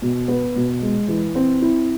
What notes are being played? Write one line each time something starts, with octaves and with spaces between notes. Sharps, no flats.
B2
B3
B2
G#3
E3
C4
E4